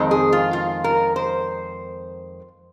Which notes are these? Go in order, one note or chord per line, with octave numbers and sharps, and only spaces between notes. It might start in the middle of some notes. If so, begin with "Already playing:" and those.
Already playing: F2 D#3 G#3 C4
G#4
F4
F4
A#4
C5